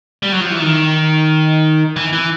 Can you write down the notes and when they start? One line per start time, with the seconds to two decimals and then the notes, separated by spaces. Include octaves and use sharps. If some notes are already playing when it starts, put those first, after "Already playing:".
0.23 G3
0.32 F#3
0.41 F3
0.51 E3
0.60 D#3
1.97 E3
2.13 E3